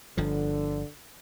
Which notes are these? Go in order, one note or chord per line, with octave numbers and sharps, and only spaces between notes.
G1 D3 F3